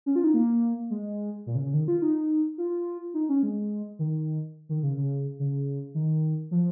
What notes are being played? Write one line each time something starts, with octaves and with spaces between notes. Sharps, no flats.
C#4
F4
D#4
A#3
G#3
A#2
C#3
C#3
D#3
F4
D#4
F4
D#4
C#4
G#3
D#3
D#3
C#3
C#3
C#3
D#3
F3